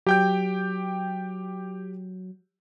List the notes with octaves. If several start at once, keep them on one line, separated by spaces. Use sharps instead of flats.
F#3 G4 G5 G6